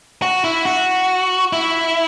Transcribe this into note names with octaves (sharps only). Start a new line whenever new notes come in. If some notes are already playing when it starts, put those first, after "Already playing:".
F#4
E4
F#4
E4